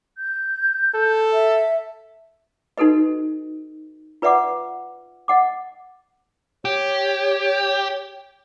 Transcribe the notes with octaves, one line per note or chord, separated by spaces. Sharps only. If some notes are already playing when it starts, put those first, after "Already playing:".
G6
A4
E5
D#4 F#4 A4 B4 D#5
F4 B4 D5 E5 F#5 D6
D#5 F#5 D6
G4 C#5